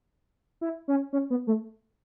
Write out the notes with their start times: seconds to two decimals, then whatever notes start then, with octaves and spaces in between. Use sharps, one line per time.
0.61 E4
0.88 C#4
1.13 C#4
1.30 B3
1.47 A3